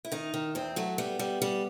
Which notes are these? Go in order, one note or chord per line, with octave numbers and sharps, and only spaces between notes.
E4
D#3 D#4
D#3
E2 C4
F#3 A3
G3 B3
G3
G3